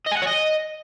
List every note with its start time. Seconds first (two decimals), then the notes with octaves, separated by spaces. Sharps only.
0.07 D#5
0.12 G#5
0.17 F#5
0.22 C#5
0.27 D#5